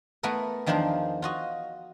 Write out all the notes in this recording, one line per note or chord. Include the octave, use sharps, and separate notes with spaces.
A3 B3 E4 A#4 B4
E2 D#3 F3 D4 A#4 C5
F4 F#4 D#5